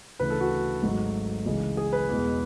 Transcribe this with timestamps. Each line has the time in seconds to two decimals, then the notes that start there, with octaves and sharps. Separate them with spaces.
0.19 D2 C#3 E3 A3 B4
0.30 A4
0.40 F#4
0.82 G#1 G#2 F#3 A3
1.46 C#2 C#3 E3 G#3
1.77 G#4
1.93 B4
2.09 E2 B2 G#3